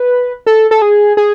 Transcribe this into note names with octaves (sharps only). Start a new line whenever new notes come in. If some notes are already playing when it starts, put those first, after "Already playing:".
Already playing: B4
A4
A4
G#4
G#4